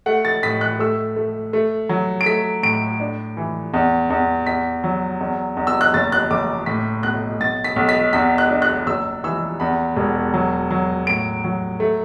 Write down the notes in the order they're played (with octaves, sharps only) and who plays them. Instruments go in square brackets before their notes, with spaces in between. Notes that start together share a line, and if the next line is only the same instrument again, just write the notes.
[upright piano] A3 F#5
A6
A2 B6
F#6
A3 E6
A3
A3
F#3
D7
A3 B6
A2 D7
D4
E3
E2
E2
E2 B6
F#3
E2
E2
E6
F#6
F#1 A6
F#6
F#1 D6
A2 B6
B1 F#6
B1 A6
B6
B1
B6
E2 B6
F#6
D4
F#6
F#1 E6
E3 E6
E2 B5
E1
F#3
F#3
A2 D7
F#3
A3